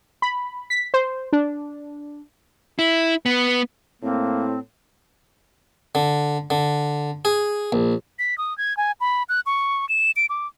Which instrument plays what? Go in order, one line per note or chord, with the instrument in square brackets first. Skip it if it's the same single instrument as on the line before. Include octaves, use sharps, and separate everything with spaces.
[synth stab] B5
B6
C5
D4
[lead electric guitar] E4
B3
[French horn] A2 [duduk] A#3 [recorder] C4
[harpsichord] D3
D3
G#4
A#1
[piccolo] B6
D#6
G#6
G#5
B5
F#6
C#6
E7
D7
D6